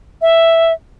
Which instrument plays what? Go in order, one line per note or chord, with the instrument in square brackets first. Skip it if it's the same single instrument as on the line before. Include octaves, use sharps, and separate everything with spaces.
[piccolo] E5